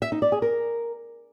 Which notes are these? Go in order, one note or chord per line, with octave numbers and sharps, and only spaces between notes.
E5
D#4
D5
G#4
A#4